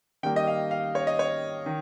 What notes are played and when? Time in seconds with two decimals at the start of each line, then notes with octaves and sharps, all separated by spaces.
0.23 D#3 G3 A#3 G5
0.36 D#5
0.47 F5
0.71 F5
0.95 C#5
1.07 D#5
1.19 C#5
1.66 D#3